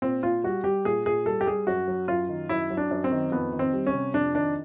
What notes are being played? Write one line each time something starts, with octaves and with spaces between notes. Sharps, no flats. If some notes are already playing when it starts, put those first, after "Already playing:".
A#2 C4
A#2 F4
G3 F#4
G3 G4
A#2 G#4
A#2 G#4
G3 A4
G4
G3 G#4
F#2 F#4
F#3
F#2 F4
D#3
F#2 E4
F#3
D4
F#2
C4
D#3
F2 B3
D#3
C4
G3
C#4
C3
F2 D4
D#3 D4